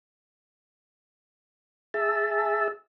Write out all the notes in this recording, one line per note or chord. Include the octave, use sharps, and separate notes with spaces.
G#4 E5 A5